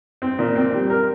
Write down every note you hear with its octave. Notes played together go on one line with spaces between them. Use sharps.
C4
A#2
C4
G3
A#4